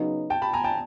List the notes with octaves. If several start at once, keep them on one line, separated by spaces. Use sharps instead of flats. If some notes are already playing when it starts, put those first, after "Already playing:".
Already playing: C#3 F#3 B3 D#4
G5 A5
A5 B5
G#5 A#5
G5 A5